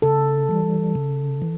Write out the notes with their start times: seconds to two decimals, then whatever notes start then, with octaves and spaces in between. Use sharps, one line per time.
0.02 C#3 A4
0.49 E3 G3
0.95 C#3
1.42 E3